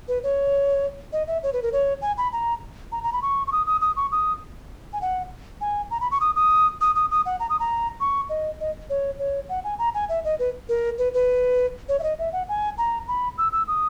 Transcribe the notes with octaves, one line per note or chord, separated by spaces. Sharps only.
B4
C#5
D#5
E5
C#5
B4
A#4
C#5
G#5
B5
A#5
A#5
A#5
B5
C#6
C#6
D#6
D#6
D#6
C#6
D#6
G#5
F#5
G#5
A#5
B5
C#6
D#6
D#6
D#6
D#6
D#6
F#5
A#5
D#6
A#5
C#6
D#5
D#5
C#5
C#5
F#5
G#5
A#5
G#5
E5
D#5
B4
A#4
B4
B4
C#5
E5
D#5
E5
F#5
G#5
A#5
B5
E6
E6
D#6